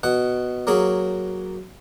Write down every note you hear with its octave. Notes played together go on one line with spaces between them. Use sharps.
B2 F#5
F#3 A#3 C#4 G#4